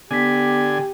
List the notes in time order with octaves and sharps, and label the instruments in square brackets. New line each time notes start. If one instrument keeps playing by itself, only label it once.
[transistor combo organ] D3 G#5 [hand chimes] B3 B6 [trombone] G4